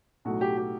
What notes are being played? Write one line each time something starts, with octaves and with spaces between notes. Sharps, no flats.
B1 A2 F#3 A3 F#4
G4
G4